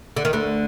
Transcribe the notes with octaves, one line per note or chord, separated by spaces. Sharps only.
D3
D#3
D2 D3